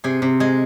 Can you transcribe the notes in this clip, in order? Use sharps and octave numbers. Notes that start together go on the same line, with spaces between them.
C3 G#4
C3
G#3 G#4